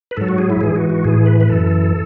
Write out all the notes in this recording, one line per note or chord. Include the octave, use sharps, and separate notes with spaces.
B4
G#2 F#3 A4
F#4
G#4
E4
G#2 E3 G#4
F#4
F#4
A2 E3 G#4
B4
B4
F#2 E3 A4